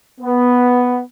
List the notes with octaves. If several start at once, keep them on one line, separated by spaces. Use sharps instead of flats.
B3